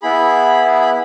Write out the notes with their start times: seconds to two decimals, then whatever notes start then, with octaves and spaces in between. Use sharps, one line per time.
0.03 B3 E4 G#4 B5
0.81 B5